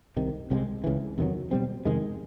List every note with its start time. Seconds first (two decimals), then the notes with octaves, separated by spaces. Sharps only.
0.17 C2 C3 D#3
0.50 C2 C3 F3 G#3
0.84 C#2 C#3 E3
1.18 E2 C3 D#3 F#3
1.51 B2 G3 C4
1.85 F2 C3 D#3 G#3